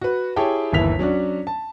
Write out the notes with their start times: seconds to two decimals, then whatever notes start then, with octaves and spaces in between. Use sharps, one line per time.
0.01 F#4 B4
0.36 E4 G4 G#4 C#5 G5 A5
0.72 G1 D#2 E3 E4 B6 F7
0.99 F#3 C#4 D4 F#4
1.47 A5